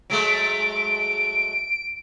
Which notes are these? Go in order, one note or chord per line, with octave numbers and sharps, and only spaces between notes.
F#3 G#3 A3 D7